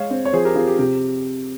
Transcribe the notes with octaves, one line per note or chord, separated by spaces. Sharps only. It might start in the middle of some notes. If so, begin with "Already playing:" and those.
Already playing: G#3 C#5 F5
C4
C#5
F3 G#4 C5
G4 A#4
C4 F4 G#4
G4
C3 G4